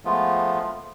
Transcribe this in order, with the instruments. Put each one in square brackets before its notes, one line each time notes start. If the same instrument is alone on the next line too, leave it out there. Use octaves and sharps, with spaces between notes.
[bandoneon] F3 G#3 A3 B3 F4